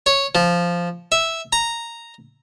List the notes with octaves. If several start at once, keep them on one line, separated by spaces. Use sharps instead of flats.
C#5
F3
E5
A#5